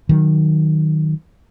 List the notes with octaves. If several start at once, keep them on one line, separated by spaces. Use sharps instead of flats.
D#3 F#3